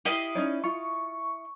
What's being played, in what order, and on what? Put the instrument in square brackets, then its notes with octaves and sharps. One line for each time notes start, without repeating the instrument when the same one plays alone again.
[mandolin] E4 D#5 F5 [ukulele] G4
[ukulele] C#4 D#4 D5
[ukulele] F4 [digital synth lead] C#6